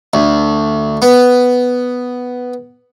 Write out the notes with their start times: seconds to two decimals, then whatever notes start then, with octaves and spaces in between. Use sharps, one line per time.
0.14 D2
1.02 B3